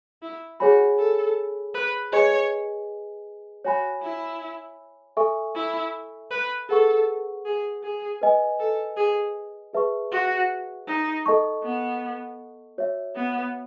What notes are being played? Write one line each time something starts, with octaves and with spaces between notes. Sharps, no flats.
E4
F#4 G#4 C#5 G#5 B5
A4
B4
G#4 B4 C#5 D#5 G#5
F#4 C#5 G#5 B5
E4
A4 E5 G#5 C#6
E4
B4
G#4 A4 B4 F#5 C#6
G#4
G#4
B4 D#5 G#5
A4
G#4
G#4 B4 E5 A5 C#6
F#4
D#4
A4 D#5 A5 C#6
B3
F#4 C#5 E5
B3